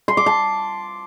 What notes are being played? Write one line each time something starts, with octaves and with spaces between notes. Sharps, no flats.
C6
D6
A5